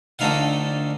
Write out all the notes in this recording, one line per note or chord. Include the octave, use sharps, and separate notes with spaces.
A#1 D3 A3 D#4 F5 F#5